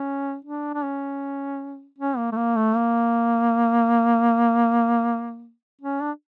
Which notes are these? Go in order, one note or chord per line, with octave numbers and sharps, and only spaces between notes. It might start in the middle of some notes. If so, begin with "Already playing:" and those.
Already playing: C#4
D4
D4
C#4
C#4
A#3
A3
A#3
A3
A#3
C#4
D4